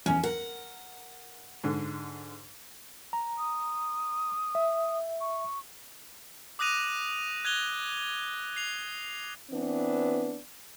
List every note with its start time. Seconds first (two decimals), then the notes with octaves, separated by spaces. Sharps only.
0.06 E2 C#4
0.24 A#4 F#5
1.64 G#2 D3
3.13 A#5
3.38 D#6
4.55 E5
5.21 C#6
6.59 D6 D#6 F#6 A#6 D#7 F7
7.45 F#6 G#6 A#6 F7 G7
8.56 C7 F7
9.50 E3 B3 C4 D4